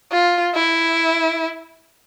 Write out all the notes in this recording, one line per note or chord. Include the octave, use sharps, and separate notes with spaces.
F4
E4